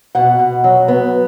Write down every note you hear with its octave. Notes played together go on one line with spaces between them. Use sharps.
B2 F#5
B2
F#3
B3